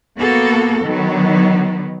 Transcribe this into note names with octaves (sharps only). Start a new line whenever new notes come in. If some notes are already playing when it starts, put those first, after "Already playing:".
A#3 B3 F#4 A4
D#3 F#3 B3